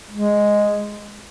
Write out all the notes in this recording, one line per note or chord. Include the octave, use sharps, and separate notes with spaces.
G#3